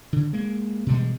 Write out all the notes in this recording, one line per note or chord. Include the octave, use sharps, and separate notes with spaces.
D3
G#3 A#3
B2 E3 G3 G#3